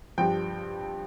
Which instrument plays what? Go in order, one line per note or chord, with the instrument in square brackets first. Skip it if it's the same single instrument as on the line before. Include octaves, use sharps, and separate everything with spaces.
[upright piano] G2 F3 G5